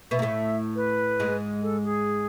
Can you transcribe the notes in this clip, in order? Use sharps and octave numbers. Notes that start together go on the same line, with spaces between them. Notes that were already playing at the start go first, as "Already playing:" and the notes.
B2 B3 E5
A#3
A2 A3
B4
G#2 G#3
A4
G#4